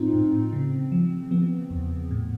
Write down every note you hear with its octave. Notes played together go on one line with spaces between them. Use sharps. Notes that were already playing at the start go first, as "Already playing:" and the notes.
Already playing: A2 F3 C4 D#4 F4
A2
C#3
F3
F3 B3
E2
A2